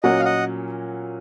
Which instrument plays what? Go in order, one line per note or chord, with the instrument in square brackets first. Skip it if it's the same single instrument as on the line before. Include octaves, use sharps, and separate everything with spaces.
[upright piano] A#2 F#3 C#4 F#4 A#4 [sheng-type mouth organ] D#5 F#5
[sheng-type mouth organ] F5
D#5 F#5